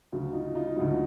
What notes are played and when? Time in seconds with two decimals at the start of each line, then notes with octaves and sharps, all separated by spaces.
0.12 D2 C#3 F#3
0.33 D#4 F4
0.55 D#4 F4
0.76 D2 C#3 F#3 D#4 F4